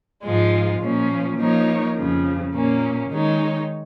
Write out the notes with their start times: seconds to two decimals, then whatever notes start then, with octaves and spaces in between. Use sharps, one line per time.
0.24 G#2 F3 G#3 F4
0.80 A#2 F3 A#3 C#4
1.38 F3 A#3 D#4 A#4 C#5
1.96 F2 C#3 F3
2.53 A#2 A#3 C#4
3.10 D#3 G#3 D#4 C#5